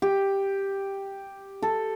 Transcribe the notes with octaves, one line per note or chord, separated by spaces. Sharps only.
G4
A4